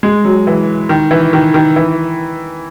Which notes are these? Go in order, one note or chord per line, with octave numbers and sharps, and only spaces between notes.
G#3
F#3
E3
D#3
E3
D#3
D#3
E3